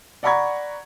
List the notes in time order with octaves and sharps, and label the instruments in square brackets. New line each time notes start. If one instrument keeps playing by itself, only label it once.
[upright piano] D5 F#5 A#5 B5 C#6 G#6